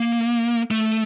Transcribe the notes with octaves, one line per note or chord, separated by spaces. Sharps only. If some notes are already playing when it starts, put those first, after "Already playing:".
Already playing: A#3
A3